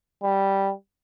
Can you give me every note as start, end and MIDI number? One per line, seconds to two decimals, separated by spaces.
0.23 0.72 55